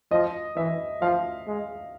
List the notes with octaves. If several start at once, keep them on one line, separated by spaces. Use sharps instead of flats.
F3 D#5
E3 E5
F3 F5
G#3